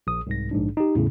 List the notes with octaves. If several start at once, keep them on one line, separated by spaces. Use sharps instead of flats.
A#1 D#6
C2 G#2 A#6
A#1 G#2 D4
D#4 G4
E2 A2 C#3